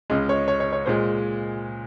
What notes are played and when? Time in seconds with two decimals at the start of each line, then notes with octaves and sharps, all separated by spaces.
0.10 C#2 C#3 G#3 D#5
0.29 C#5
0.48 C#5
0.60 C#5
0.73 C#5
0.86 A#2 G#3 C5